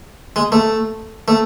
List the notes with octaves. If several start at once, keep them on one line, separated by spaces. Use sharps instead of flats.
G#3
A3
A3